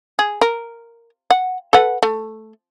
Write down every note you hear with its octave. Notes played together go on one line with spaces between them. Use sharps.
G#4
A#4
F#5
A4 B4 F#5
A3